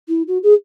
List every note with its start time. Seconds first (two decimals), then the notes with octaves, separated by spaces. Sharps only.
0.08 E4
0.27 F#4
0.43 G#4